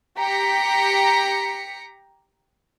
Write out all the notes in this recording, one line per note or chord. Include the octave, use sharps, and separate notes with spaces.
G4 A#5 B6 C#7